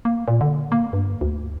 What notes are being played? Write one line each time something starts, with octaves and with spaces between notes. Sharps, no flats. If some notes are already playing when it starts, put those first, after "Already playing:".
A#3
A#2
D3
A#3
G2
D2